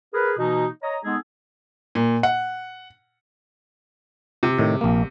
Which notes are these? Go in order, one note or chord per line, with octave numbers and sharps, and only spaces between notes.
G#4 A#4 B4
B2 E3 A#3 D#4
C#5 D#5 A#5
G#3 B3 D#4 G#4 A4
A#2
F#5
C3
A2 D#3
A#1 A#3